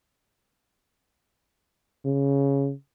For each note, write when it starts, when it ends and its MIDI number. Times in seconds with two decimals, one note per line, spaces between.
2.05 2.72 49